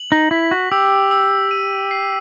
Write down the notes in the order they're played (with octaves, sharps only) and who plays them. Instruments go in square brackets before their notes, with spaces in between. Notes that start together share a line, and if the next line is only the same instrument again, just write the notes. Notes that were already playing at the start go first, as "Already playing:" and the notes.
Already playing: [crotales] F#7
[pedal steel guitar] D#4
[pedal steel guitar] E4 [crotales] B6
[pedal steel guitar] F#4
[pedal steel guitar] G4 [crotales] E6
[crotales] E6
D#7
C7